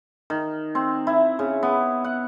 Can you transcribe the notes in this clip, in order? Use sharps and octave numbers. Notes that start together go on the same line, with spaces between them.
D#3
C4
E4
C#3
B3
F#5